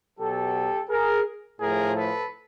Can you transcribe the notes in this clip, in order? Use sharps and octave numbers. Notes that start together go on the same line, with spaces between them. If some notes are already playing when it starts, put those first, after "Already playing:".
B2 F#3 G4 A4
G#4 A#4
A2 F3 G#4 A#4
A4 B4